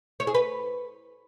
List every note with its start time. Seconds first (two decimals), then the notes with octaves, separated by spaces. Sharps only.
0.20 C#5
0.27 G#4
0.35 B4